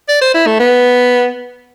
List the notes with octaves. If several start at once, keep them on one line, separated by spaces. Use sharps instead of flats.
D5
C5
E4
A3
B3